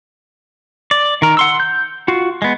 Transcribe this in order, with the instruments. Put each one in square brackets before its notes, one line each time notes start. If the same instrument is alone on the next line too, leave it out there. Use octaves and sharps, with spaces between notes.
[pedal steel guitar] D5
D#3 A#4
F#5 C6 E6
G6
F4 F#4
G#3 B3